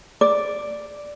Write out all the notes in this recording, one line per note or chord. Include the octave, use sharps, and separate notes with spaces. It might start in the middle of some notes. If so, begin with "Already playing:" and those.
D5